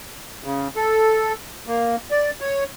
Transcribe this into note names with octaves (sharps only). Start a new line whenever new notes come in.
C#3
A4
A#3
D5
C#5